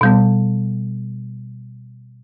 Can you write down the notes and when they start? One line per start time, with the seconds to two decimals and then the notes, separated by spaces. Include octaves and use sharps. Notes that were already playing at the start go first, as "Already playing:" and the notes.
0.01 B2 G3 B3